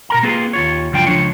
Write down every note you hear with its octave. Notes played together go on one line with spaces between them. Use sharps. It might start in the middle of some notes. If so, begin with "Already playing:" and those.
B2 A#4 A#5
A#3 C4 F4 G#4 B4
D#2 F4 C#5
C#2 F#2 F3 D4 F4 G5
C#2 F3 D4 C#5